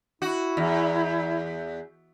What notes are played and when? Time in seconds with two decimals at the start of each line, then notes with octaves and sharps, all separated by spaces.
0.22 E4 F#4
0.57 E2